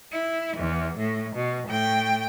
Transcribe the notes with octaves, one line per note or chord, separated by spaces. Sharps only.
E4
E2
A2
B2
A2 G5